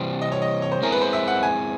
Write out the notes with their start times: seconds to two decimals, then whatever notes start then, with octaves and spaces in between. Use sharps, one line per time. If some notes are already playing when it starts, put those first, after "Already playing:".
Already playing: C3 E3 G3 C4
0.21 D#5
0.32 C#5
0.42 D#5
0.62 C#5
0.72 C5
0.82 G#3 C4 E4 G#4 A#4
0.92 B4
1.02 C5
1.13 E5
1.28 F#5
1.43 G#5